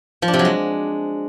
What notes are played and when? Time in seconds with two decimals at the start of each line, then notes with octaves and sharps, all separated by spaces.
0.22 F3
0.28 D4
0.34 C3
0.39 F#3
0.45 G#3